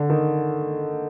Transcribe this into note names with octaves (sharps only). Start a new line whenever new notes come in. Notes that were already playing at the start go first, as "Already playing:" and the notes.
Already playing: D3
D#3